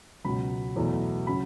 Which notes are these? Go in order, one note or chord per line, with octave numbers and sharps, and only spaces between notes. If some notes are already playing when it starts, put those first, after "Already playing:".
C#2 B2 F#3 B5
E2 B2 F#3 A3
C#3 F#3 B5